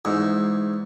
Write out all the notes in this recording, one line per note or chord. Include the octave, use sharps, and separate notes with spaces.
E2 G#2